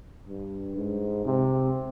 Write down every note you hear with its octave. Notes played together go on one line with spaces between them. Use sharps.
G2
G#2
C3